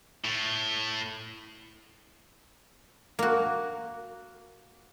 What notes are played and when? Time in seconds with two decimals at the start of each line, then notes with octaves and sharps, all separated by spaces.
0.25 A2
3.19 A#3 F#4